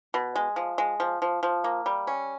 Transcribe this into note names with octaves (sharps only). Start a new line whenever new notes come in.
B2
G#3
F3
G#3
F3
F3
F3
A#3
G3
C#4